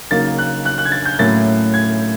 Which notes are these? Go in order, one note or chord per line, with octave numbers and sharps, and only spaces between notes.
C#3 F#3 A#3 D#4 A6
F#6
F#6
F#6
G#6
A6
G6
A2 F#3 A#3 C#4 E4 A6
G#6